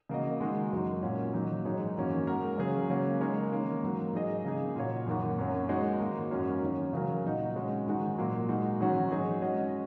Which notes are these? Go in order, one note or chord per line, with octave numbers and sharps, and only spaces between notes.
C#3 A#3 F#4 D#5
D#3 G#3 F#4
F#2 F#3 A#3 D#4
A#2 A#3 C#4 F#4
D#3 F#3 A#3 D#4
G#2 F#3 D#4 G#4 C#5
F#2 D#3 F#3 A#3 C#4
G#3 F#4 A#4
C#3 F#3 C#4 G#4
C#3 F#3 A#3 C#4
G#3 D#4 A#4 C#5
D#3 A#3 C#4
G#2 F#3 A#3
F#3 D#4 G#4 D#5
C#3 A#3 D#4 G#4
A#2 A#3 F#4 A#4 C#5
F#2 D#3 A#3 F#4
F#2 F#3 A#3 C#4
G#3 D#4 F#4 C#5
G#2 D#3 A#3 F#4
F#2 F#3 C#4 F#4 A#4
D#3 F#3 C#4
C#3 F#3 C#4 A#4
A#2 F#3 D#4 F#4 D#5
G#3 C#4 F#4
G#2 D#3 G#3 F#4
A#2 F#3 A#3
G#3 D#4 F#4
G#2 D#3 F#3 C#4 F#4
F#3 D#4 G#4 C#5
G#3 C#4 F#4 D#5